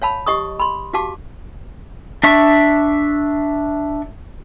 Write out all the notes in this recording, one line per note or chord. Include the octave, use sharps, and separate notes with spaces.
C#5 F5 A5 B5
G4 D#5 C#6 D#6
B5 C6
F#4 G4 F5 A5 D6
D4 E5 C#6